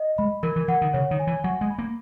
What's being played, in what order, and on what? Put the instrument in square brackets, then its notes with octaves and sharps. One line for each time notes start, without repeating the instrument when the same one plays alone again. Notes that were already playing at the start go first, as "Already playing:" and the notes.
Already playing: [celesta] D#5
[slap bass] G#3 [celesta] B5
[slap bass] E3 [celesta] A#4
[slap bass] E3
[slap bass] E3 [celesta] F#5
[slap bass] D#3
[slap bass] C#3 [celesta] C#5
[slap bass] D#3
[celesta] G#5
[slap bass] E3
[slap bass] F#3 [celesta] F#5
[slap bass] G#3
[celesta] B5
[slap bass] A#3